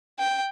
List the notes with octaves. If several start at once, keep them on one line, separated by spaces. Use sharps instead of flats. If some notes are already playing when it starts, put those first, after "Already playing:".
G5